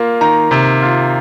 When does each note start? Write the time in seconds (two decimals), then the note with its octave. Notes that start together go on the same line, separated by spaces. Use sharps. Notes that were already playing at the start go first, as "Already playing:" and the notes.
Already playing: A#3 F4
0.21 D#3 A#5
0.51 C3
0.82 F4